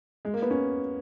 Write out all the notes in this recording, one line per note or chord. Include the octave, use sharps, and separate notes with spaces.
G#3
A#3
B3
C#4